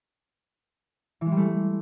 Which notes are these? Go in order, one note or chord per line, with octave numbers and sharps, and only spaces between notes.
E3
G#3
G3
A3